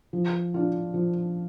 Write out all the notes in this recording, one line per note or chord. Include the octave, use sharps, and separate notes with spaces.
F3
D4 F4
F3